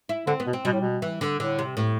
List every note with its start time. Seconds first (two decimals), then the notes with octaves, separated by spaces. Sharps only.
0.09 E4
0.27 D3 C4
0.40 B3
0.47 B2
0.53 C4
0.65 B2 G3
0.73 A2
0.81 B2
1.02 E3
1.21 D3
1.39 A2 D3
1.59 C3
1.77 A2